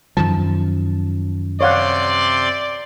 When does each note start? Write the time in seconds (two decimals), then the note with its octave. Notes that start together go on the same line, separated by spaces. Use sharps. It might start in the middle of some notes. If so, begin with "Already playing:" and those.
0.17 F#2 D#3 F3 A5
1.61 C3 C#5 D5 F5 F#5 C6